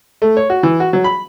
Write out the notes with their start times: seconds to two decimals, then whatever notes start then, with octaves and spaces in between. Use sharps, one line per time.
0.22 A3
0.37 C#5
0.50 F#4
0.63 E3
0.80 F#4
0.93 F#3
1.04 B5